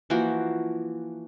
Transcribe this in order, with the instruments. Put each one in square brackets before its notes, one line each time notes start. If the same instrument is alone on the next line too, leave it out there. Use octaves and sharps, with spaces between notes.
[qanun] E3 F3 A#3 F#4